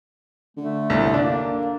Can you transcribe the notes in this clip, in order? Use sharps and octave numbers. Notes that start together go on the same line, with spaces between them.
D3 A3
C2
A#3 D4